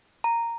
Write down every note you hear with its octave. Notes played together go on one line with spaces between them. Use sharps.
A#5